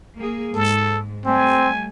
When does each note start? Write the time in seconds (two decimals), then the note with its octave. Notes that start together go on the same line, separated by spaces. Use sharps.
0.18 A#3 G#4
0.54 G#2 A4
1.26 G3 A3 C4 G#5